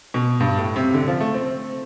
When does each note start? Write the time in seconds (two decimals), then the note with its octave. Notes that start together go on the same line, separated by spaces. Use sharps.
0.14 B2
0.40 G2
0.58 A2
0.76 C3
0.94 D3
1.08 F3
1.20 A3
1.34 C4